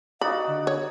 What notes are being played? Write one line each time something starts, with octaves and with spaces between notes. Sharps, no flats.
D#4 F#4 D5 F5 B5
D3
C#5